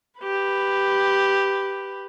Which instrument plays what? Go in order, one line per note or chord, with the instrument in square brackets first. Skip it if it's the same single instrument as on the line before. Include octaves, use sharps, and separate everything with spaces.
[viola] G4 B4